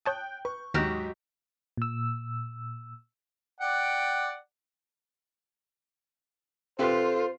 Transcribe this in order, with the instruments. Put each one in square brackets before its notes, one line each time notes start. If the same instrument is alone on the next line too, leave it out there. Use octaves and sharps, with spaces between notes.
[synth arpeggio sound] C#5 A5 D#6 [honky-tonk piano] G5 F#6 G6
[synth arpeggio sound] B4 [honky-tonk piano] C#6
[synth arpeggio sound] D#2 F6 [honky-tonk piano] G#2 D#5 B6 [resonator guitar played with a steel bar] F#3 F#4 G4
[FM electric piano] A#2 E6
[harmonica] D5 F#5 G5
[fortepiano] C3 G4 B4 [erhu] F4 [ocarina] A4 [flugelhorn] C5